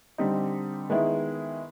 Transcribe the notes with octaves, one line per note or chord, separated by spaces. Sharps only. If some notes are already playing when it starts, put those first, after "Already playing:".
D3 G3 C4 D#4
D#3 G#3 B3 E4